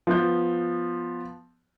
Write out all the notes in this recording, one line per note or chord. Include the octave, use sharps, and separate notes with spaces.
F3 B3 G6